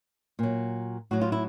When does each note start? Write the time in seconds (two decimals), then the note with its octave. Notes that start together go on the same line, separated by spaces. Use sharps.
0.39 A#2 F#3
1.11 A2 F#3 F#4
1.21 F4
1.32 E4